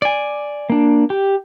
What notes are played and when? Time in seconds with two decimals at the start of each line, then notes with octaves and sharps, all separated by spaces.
0.02 D5 G#5
0.70 A#3 D4
1.10 G4